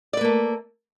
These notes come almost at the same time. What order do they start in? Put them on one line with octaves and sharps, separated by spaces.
D5 B4 A#3 A3